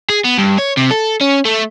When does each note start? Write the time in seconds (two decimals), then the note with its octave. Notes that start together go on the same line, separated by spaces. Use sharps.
0.09 G#4
0.24 B3
0.38 G2
0.58 C#5
0.77 C3
0.91 A4
1.21 C#4
1.45 A3